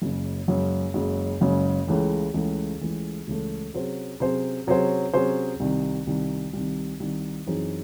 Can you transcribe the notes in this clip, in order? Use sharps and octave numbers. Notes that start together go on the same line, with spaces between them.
F#1 F#2 C#3 G#3
F#1 F#2 C#3 G#3
F#1 F#2 C#3 G#3
F#1 F#2 C#3 G#3
C#2 C#3 E3 A3
C#2 C#3 E3 A3
C#2 C#3 E3 A3
C#2 C#3 E3 A3
C3 F#3 C#4 G#4 C5
C3 F#3 C#4 G#4 C5
C3 F#3 C#4 G#4 C5
C3 F#3 C#4 G#4 C5
C2 C3 D#3
C2 C3 D#3
C2 C3 D#3
C2 C3 D#3
F#2 E3 C4 D#4 G#4